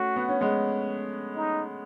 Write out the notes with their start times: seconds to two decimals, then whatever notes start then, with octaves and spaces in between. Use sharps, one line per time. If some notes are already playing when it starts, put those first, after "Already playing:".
Already playing: A3 C#4 F#4
0.16 B3
0.29 C#4
0.41 G#3 B3
1.37 D#4